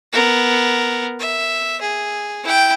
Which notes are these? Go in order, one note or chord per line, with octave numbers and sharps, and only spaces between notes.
B3 A#4
E5
G#4
E4 G5